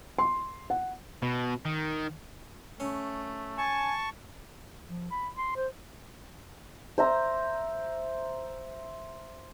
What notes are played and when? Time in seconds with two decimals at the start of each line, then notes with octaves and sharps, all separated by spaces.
0.18 C6
0.70 F#5
1.23 B2
1.65 D#3
2.80 A3 C#4
3.58 G#5 A5 C#6
4.88 F3
5.10 B5
5.37 C6
5.56 C5
6.98 C5 E5 A#5